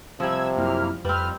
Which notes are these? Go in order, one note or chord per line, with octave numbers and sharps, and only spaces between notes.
C3 F3 G3 E6 G#6
F#2 A#3 E4 F6
F2 G3 C4 B4 F6